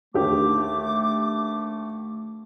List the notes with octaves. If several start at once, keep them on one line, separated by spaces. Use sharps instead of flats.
D#2 D3 A3 G4 D6